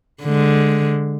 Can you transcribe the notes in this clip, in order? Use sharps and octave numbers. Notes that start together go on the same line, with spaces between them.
D3 G#3